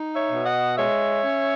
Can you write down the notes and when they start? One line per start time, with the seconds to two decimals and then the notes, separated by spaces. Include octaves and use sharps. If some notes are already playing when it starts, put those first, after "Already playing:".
Already playing: D#4
0.14 C#5 E5
0.30 B2
0.45 D#5 F#5
0.77 G#3 C#5 E5
1.24 C#4